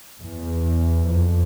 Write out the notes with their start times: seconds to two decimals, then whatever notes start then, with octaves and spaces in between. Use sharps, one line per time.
0.20 E2
1.08 F2